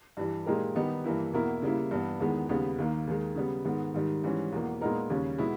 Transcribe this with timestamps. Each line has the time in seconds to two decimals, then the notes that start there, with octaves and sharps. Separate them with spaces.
0.17 G2 E3 G3
0.46 A#2 G#3 D#4 G4 A#4
0.75 D#3 G3 B3 D#4 G4
1.04 G2 E3 A#3 E4
1.33 E2 B2 A#3 E4 A#4
1.62 C#3 G3 A#3 E4
1.91 G2 E3 G3 B3
2.20 E2 D#3 G#3 B3
2.49 D#2 C#3 G3 B3
2.78 D#2 D#3 A#3
3.07 D#2 D#3 G#3
3.36 C#3 G3 B3
3.65 G#2 D#3 G#3 B3
3.94 G#2 D#3 G3
4.24 G#2 E3 G3 C#4
4.52 E2 B2 A#3
4.81 A#2 G#3 B3 D#4 A#4
5.10 D#2 C#3 G3 C#4
5.39 B2 G#3 B3 E4